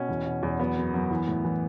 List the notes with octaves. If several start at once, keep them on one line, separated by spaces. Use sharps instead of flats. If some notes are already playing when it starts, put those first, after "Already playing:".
Already playing: B2 C#4
E2
B2
E2
F#3 B3
F#2
F#2
E3
A2
E3